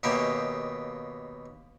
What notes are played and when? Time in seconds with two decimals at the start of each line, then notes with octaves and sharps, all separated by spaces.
0.03 D#2 B2 A#3 C#4 G4 E5